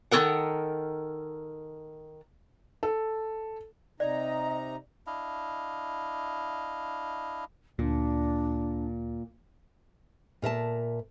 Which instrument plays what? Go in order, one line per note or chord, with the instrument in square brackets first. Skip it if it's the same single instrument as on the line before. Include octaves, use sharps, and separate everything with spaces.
[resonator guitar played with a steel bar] D#3 F4 A4 A#4 F#5
[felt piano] A4
[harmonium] C3 D#4 A#5 [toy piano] D5 [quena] D#5
[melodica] D4 E4 D#5 F5
[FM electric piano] D2 [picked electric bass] A#2 [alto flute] D4
[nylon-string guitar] A#2 A#4 E5 A5